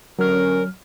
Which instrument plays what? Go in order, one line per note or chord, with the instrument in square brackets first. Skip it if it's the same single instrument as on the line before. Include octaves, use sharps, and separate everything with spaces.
[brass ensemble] D3 C#4 [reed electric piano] F#3 F6 [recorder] A#4